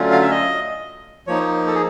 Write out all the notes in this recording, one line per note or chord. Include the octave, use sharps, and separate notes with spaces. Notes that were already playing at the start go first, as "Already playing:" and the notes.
Already playing: D3 F#3 A3 C#4 F4
F5
E5
D#5
F3 A#3 D#4 C#5
A4
G#4